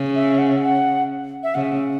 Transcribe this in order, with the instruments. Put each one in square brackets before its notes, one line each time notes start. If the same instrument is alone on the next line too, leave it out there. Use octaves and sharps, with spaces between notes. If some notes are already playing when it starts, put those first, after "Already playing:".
Already playing: [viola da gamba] C#3
[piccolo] E5
F#5
F#5
E5
[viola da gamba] C#3 [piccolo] F#5